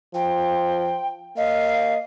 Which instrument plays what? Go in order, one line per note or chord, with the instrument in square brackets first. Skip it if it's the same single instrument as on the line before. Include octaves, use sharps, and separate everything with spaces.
[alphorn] F3 [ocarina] G5
[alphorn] A#3 [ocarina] D#5 [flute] F5